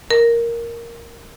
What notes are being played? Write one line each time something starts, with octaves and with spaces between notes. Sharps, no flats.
A#4